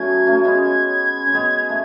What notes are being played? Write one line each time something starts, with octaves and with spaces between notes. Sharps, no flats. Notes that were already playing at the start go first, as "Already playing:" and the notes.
Already playing: F#3 A3 B3 C#4 G#6
A3 C#4
G#3 B3
G#6
C#4
G#3 B3
A3